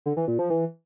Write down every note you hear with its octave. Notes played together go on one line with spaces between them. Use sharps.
D3
E3
A#2
F3
E3